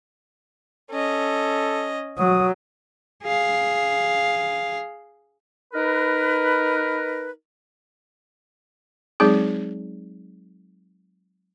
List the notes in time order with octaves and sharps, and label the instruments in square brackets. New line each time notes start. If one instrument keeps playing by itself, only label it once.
[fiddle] C#4 D#5 [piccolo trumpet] A4
[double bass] F#3 [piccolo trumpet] D#6
[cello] G#4 F5
[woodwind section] D#4 A#4 B4
[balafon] F#3 G#3 C4 D#4 G#4